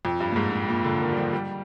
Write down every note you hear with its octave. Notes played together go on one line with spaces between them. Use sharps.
F2
G2
A#2
G#2
A#2
A#2
D3
D#3
G3
F3
G3